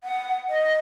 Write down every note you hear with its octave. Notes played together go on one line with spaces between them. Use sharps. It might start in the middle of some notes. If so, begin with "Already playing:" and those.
F#5
D#5